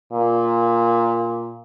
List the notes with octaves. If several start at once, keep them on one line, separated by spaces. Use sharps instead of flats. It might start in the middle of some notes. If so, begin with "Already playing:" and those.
A#2